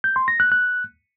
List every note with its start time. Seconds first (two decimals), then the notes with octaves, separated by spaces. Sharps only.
0.04 G6
0.16 C6
0.28 A#6
0.40 F#6
0.52 F#6